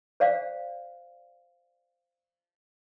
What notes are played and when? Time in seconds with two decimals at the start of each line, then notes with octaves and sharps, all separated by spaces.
0.20 C5 D5 F5